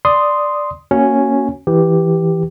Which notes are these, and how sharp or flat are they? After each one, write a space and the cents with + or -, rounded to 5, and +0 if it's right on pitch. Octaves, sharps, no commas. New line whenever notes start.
D5 +5 C6 -5 D#6 +0
A#3 +0 C#4 +0 F#4 +0
E3 +0 G4 +0